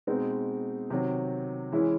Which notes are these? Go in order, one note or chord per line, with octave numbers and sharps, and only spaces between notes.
B2 G#3 C4 D#4
C3 D#3 F#3
E3 G#3 C#4 E4